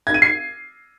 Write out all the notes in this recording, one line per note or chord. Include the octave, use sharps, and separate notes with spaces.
G#6
D#7
C7